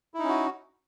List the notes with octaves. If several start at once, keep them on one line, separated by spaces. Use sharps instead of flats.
C#4 D#4 E4 F#4